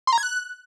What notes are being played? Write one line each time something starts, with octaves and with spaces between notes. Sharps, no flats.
C6
A#5
G#6
F#6